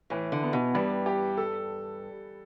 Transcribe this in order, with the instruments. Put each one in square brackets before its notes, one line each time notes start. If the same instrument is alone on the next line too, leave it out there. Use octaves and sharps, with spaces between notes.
[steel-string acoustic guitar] A2 [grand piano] E3
[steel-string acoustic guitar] D3
[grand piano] B3
[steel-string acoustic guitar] B2
[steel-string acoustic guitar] G2 [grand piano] G3
[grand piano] G4
A4